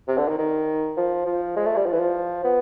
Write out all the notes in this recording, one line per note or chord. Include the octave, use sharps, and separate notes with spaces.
C3
D3
D#3
D#3
F3
F3
G#3
A3
G3
F3
E3
F3
B3